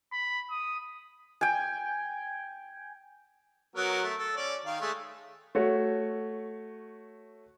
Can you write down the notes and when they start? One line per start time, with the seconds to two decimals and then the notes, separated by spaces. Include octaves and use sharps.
0.12 B5
0.50 D#6
1.41 G5 G#5
3.76 F#3 B3 A#4
4.03 A3
4.18 A4
4.36 C#4 D5
4.66 D#3 F5
4.81 G#3 A3
5.55 A3 F#4 C#5